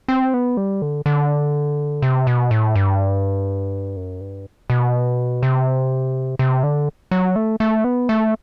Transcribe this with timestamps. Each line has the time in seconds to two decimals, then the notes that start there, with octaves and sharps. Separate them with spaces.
0.08 C4
0.34 B3
0.57 G3
0.82 D3
1.06 D3
2.02 C3
2.27 B2
2.51 A2
2.76 G2
3.96 F#2
4.21 G2
4.70 B2
5.43 C3
6.39 C3
6.63 D3
7.11 F#3
7.36 A3
7.60 A3
7.84 B3
8.09 A3